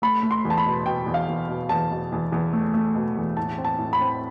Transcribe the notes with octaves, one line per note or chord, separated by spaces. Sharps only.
A3 B5
A3
C6
E2
A5
B5
B2
B2 G5
E2
F5
E2
B2
E2 A5
B2
E2
E2
A3
A3
B2
E2
A2 A5
C4
A5
A2
B5
C4